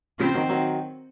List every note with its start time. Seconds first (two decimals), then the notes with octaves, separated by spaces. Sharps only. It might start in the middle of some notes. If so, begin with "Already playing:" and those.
0.20 C#3 F3 C4
0.34 D#3 F#3
0.49 D#3 F#3